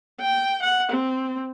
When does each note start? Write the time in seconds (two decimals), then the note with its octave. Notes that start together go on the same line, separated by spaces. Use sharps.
0.21 G5
0.62 F#5
0.92 C4